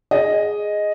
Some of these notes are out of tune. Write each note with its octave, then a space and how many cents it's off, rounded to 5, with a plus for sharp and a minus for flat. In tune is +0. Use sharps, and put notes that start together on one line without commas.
G#4 +0 D#5 +0